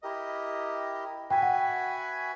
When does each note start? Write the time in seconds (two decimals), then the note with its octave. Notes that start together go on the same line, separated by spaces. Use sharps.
0.02 E4 G4 A#4 D#5
1.30 F#4 B4 E5 G5 G#5
1.42 F#5